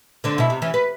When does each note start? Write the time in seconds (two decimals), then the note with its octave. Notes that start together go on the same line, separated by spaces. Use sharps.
0.24 D3 C4 D4
0.38 B2 E4
0.50 C3
0.62 E3 C#4
0.74 B4